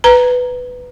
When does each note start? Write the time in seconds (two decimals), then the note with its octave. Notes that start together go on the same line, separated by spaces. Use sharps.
0.04 B4 A#5